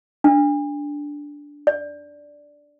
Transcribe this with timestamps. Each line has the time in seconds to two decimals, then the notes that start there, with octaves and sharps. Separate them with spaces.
0.24 D4
1.67 D5